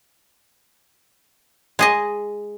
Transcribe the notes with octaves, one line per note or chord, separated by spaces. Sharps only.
G#3 G#4 D#5